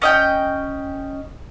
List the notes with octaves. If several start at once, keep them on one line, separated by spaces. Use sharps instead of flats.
C#4 D#5 F5 G5